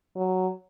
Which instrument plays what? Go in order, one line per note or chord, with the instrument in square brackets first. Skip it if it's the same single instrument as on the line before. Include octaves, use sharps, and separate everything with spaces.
[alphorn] F#3